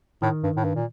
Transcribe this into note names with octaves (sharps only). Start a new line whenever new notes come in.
A2 D#3
G2
A2
G2
A#2